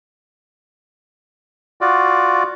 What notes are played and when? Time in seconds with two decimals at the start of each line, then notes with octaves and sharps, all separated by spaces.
1.81 F4 F#4 D5